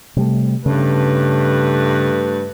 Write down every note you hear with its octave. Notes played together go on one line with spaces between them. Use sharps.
C3 G3 A3
G2 C#3 A3 B4